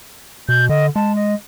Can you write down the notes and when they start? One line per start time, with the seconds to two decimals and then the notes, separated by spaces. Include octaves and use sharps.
0.49 B2 G6
0.69 D3 D#5
0.96 G#3 A5
1.16 D#5